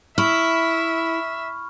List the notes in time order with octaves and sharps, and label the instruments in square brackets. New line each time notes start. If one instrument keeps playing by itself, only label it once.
[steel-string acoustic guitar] E4 [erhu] E5 [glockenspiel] B5 C#6 F6